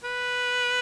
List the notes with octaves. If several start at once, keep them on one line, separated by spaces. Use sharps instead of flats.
B4